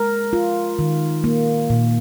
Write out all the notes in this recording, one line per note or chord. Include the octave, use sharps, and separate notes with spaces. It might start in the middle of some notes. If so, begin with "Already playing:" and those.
Already playing: G#3 A#4
F4
D#3
A#3
A#2